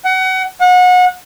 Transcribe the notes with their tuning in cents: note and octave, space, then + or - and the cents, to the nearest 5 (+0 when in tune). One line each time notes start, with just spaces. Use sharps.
F#5 +25
F#5 -30